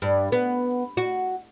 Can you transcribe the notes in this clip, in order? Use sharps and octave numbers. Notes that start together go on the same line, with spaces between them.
G2
B3
F#4